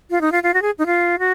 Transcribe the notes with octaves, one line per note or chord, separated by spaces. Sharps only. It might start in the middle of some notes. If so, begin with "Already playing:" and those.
F4
D#4
F4
F4
F#4
G#4
D#4
F4
F#4